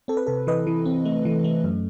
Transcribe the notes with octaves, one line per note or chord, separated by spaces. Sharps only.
C4 A4
B4
C3 A4
E3 B4 D#5
E3
C4
A3
E3
A3
F#2